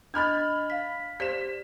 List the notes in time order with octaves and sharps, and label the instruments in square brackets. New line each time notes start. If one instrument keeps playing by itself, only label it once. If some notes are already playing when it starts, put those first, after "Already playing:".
[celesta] D4 D#5 A6 [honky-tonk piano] B5 F6 G#6
[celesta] F5 B6
[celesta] G4 C5 D5 [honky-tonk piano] B6 E7